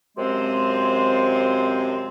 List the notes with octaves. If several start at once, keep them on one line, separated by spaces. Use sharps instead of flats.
F#2 C3 F3 G#3 C4 C6